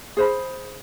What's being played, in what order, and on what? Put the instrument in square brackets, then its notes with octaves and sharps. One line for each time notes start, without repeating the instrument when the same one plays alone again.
[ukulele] G#4 C5 B5